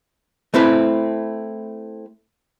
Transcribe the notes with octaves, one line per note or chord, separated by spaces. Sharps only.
A3 C4 E4 B4